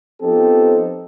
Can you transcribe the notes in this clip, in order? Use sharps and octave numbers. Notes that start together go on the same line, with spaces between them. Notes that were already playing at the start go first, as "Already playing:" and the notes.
F3 B3 C4 D#4 G4 A4